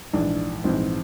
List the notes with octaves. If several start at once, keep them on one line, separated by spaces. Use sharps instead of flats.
A#1 G#2 E3 D4
A#1 G#2 E3 C4